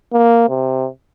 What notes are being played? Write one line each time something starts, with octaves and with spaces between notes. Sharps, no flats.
A#3
C3